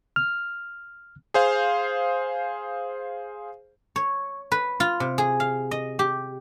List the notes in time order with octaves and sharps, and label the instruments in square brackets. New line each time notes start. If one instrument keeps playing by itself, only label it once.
[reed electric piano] F6
[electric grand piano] G#4 C5 F5
[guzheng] C#5
B4
F4
C3
G#4
F5
D#5
G4